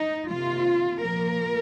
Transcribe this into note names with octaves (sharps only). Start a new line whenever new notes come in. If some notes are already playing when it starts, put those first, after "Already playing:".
Already playing: D#4
C3 D#3 A#3 F4
A#2 F3 A#3 A#4